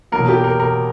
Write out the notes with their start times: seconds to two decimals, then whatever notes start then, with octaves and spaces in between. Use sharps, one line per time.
0.12 E2 B2 F#3 A#3 A#4
0.29 G4
0.44 A#4
0.60 A#4